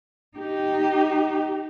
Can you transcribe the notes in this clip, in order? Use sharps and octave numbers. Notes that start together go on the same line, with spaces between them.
D#4 G4